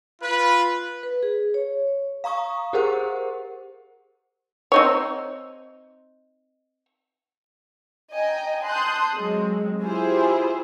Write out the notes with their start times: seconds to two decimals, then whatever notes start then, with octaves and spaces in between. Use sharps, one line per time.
0.21 F4 B4
1.03 B4
1.23 G#4
1.54 C#5
2.24 F5 A#5 C#6 D#6
2.73 G4 G#4 A#4 C5 F#5
4.72 C4 D#4 C#5
8.14 D#5 G5 G#5 A#5
8.64 A5 C6 D#6 F#6 G6
9.16 F#3 G#3 C4
9.82 E4 F4 G4 G#4 C5